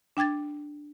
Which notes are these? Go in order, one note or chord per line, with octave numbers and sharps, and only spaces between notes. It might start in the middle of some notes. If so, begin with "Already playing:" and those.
D4 G5 D6 G#6 A6